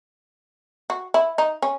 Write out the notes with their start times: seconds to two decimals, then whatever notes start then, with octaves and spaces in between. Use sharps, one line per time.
0.90 F#4
1.14 E4
1.38 D#4
1.62 C#4